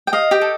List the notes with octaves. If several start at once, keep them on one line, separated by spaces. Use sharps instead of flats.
G5
D#5 F5
G4 G5
A4